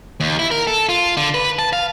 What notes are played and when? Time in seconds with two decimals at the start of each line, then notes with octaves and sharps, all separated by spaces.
0.20 D#2
0.39 E4
0.51 A#4
0.67 A4
0.89 F4
1.17 D3
1.34 B4
1.59 A5
1.73 F5